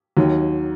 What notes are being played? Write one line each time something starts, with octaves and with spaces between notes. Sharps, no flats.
D#2 D#3 F#3